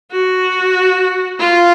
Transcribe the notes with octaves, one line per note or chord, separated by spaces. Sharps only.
F#4
F4